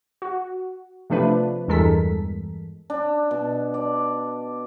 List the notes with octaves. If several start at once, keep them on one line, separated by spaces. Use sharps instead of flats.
F#4
C3 F3 A3 D4 B4
E2 G2 G#3 A4 A#4 B6
D4
B2
D5